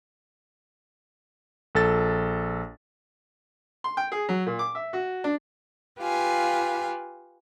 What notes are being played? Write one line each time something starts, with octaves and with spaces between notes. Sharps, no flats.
A#1 A4 A6
C6
G5
G#4
F#3
A#2
D6
E5
F#4
D4
F4 G4 B4 F5 G#5